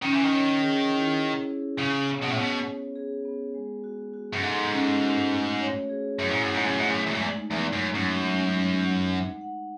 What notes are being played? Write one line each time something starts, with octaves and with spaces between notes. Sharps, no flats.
D#3 C#4
E3
D#3
C#5
G#4
E4
C#4
G#4
C#3 C#5
B3
B2
A2
B2 C#5
B3
G#4
B3
G#3
F#4
F#4
F#2
G#2 A4
C#4
F#4
A3
C#5
G#4
F#2 E4
G#2
F#2
A3
G#2
F#2
G#2 A3
F#2
E2 G#3
F#2
E2
D#4
E2
G#3
F#2
F#2 D#4
G#3
D#4
F#5
F#5
F#5